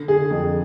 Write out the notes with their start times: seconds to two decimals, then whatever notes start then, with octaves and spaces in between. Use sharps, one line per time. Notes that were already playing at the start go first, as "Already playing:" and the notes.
Already playing: D3
0.08 G#4
0.31 F2